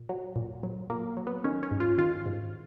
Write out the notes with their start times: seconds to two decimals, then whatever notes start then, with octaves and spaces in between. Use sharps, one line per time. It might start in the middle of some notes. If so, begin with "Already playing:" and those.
Already playing: A#2
0.09 F#3
0.36 A#2
0.63 F#3
0.90 A#2 A#3
1.17 F#3
1.27 B3
1.44 D#3 C#4
1.63 C#4
1.71 G#2
1.80 F4
1.98 D#3 F4
2.26 G#2